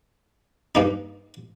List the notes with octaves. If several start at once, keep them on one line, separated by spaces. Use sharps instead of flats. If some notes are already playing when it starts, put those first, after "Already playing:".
G2 A#3 D#4